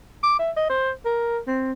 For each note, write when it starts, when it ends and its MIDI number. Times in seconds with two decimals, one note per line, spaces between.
0.23 0.36 86
0.39 0.51 76
0.57 0.65 75
0.69 0.91 72
1.05 1.39 70
1.47 1.72 60